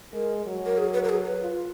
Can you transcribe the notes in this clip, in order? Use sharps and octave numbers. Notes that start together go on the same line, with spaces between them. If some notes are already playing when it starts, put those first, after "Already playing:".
G#3 A#4
F#3
A#4
G#4
B4
A#4
G#4
B4
F4